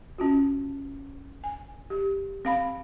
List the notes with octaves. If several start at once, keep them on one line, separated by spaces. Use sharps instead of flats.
C#4 F4 F#4
G#5
G4
C4 F5 B5